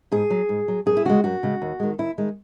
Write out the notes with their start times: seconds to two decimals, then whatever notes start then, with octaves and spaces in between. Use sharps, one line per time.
0.12 G#2 G#4
0.30 F#3
0.49 G#2
0.68 F#3
0.86 F#2 G#4
0.97 E4
1.05 C#3 G#3 F#4
1.24 F#2 F#4
1.43 C#3 G#3
1.62 D#2
1.80 D#3 G#3
1.99 D#2 E4
2.18 D#3 G#3